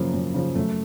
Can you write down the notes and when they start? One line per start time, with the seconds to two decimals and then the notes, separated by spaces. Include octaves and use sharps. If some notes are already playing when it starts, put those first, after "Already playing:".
Already playing: F#2 C#3 F3 A#3
0.14 F#2
0.34 C#3 F3
0.55 F#2 A3